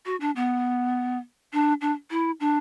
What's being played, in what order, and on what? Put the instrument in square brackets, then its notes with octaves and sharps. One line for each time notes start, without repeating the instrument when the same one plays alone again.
[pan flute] F#4
D4
B3
D4
D4
E4
D4